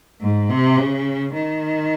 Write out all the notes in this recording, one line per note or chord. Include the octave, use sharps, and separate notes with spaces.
G#2
C3
C#3
D#3